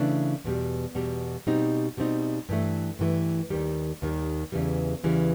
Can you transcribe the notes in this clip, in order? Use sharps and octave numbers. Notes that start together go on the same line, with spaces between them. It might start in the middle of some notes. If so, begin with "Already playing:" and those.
Already playing: C#3 E3 A3 D4
E2 B2 G3
E2 B2 G3
B2 G3 C4 D#4
B2 G3 C4 D#4
G2 E3 A3
G2 E3 A3
D#2 D#3 G3
D#2 D#3 G3
E2 C#3 E3 G3
E2 C#3 E3 G3